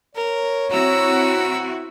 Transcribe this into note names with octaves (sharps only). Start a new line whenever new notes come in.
A#4 C#5
C4 E4 F#4 A#5 E6